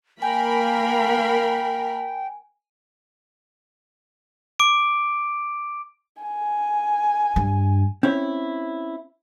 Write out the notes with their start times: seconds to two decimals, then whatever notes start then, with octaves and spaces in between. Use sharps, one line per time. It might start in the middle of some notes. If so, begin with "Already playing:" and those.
0.22 A#3 A#4 F5 G5 G#5 B5
4.59 D6 D7
6.22 G#5
7.36 G2
8.03 C4 C#4 E4 C#5